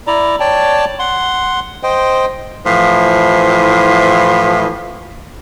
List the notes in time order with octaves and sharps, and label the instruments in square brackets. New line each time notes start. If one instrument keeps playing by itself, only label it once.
[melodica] E4 D5 A#5
C#5 D5 G5 A5
F#5 C6
C5 D#5 G5
[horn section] A2 E3 F3